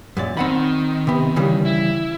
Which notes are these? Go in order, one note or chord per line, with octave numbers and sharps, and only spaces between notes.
F#2 A#2 D5
D#3 C4 F#5 B5
C3 B3
C#3 E3 G3
E4